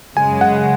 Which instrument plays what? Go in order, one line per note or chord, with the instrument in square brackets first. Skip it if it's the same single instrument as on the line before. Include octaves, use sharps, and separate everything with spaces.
[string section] F#2 C#3 G#3 [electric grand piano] G#5
[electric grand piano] F#5